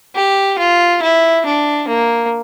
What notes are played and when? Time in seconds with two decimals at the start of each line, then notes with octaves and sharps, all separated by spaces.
0.15 G4
0.58 F4
1.02 E4
1.46 D4
1.88 A#3